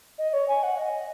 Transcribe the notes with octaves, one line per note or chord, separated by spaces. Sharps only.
D#5
C#5
G#5
F#5
D#5